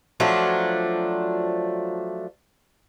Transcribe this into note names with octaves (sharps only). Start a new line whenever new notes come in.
F3 F#3 A3 D4